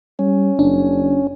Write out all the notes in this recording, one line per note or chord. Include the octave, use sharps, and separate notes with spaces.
G3 C#4
F#1 D4